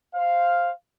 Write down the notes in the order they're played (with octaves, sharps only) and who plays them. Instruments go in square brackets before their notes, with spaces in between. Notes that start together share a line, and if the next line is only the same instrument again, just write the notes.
[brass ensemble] C5 F5